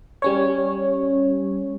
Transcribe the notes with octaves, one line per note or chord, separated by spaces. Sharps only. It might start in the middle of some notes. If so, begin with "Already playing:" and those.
G3 C#4 C#5